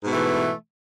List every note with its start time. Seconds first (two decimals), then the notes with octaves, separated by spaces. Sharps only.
0.03 G#2
0.06 B2
0.10 A3
0.13 E3